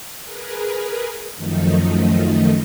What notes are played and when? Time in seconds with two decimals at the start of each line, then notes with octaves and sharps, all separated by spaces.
0.24 G#4 A#4 B4
1.35 F#2 D#3 F3 A3 D#4